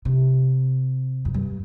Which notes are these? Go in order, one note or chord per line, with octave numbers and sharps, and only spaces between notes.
C3
F2
G2